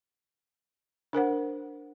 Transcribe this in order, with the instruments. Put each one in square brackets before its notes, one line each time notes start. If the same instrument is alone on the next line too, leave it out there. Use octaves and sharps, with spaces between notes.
[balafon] D4 A#4 C5 F#5